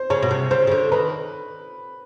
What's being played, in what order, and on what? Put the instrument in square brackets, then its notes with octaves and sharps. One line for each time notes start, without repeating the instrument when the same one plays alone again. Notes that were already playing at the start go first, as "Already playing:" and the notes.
Already playing: [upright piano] C5
[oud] C#3 [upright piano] C#5
[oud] B2
C3
[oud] C#3 [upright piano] C5
[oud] C#3
D3
[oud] D#3 [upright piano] B4